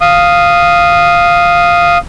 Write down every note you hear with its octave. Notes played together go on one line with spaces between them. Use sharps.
F5 D#6